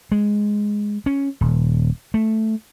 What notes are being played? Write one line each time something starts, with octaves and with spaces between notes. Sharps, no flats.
G#3
C#4
D#1
A3